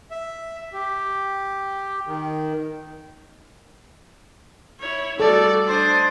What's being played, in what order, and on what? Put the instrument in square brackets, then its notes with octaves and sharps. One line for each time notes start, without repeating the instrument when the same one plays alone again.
[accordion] E5
G4
D#3
[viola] E4 C#5
[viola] G3 F#4 [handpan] A4 [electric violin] D5
[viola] D4 D#5 [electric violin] C5 [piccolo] A6